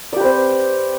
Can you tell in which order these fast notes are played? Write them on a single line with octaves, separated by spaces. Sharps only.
D5 G4 B4 C4